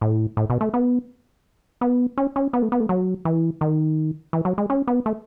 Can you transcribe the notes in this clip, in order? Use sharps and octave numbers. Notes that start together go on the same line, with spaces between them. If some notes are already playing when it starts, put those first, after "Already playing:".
A2
A2
B2
A3
B3
B3
C#4
C#4
B3
A3
B3
A3
F#3
E3
D#3
E3
F#3
G#3
C#4
B3
A3